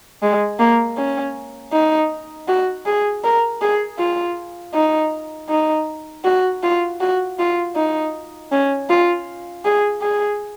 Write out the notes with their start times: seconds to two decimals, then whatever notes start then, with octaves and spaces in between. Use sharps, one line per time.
0.22 G#3
0.59 A#3
0.98 C#4
1.73 D#4
2.48 F#4
2.86 G#4
3.24 A#4
3.61 G#4
3.99 F4
4.74 D#4
5.49 D#4
6.24 F#4
6.63 F4
7.00 F#4
7.39 F4
7.75 D#4
8.52 C#4
8.90 F4
9.65 G#4
10.02 G#4